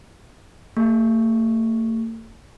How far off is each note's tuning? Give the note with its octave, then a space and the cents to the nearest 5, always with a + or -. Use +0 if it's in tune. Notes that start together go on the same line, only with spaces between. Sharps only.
A3 +45 G#4 -30 C#6 +0